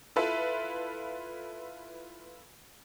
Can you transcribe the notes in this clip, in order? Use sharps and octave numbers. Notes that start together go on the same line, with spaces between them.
E4 F4 A4 B4 E5